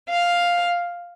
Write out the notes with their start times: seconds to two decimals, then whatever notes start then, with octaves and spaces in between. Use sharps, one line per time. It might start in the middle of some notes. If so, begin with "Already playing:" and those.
0.09 F5